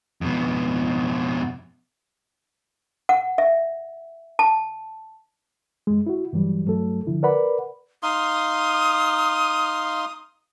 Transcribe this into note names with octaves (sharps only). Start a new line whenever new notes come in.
F2 B2
F#5
E5
A5
F#2 G#3
E4 F#4
G2 E3 F#3 G3
G2 F#3 A3 A4
D3 F3 E4
A#4 B4 D5 F#5 B5
D#4 F5 C6 D#6